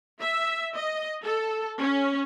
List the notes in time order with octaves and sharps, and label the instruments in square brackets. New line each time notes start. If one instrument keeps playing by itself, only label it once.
[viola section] E5
D#5
A4
C#4